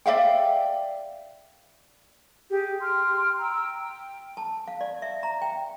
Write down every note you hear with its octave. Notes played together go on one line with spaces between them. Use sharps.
D5 E5 F5 G5
G4 G#4
G5 C6 F6
G5 A#5 E6
G5
A5
F5
D5
E5
A#5
G5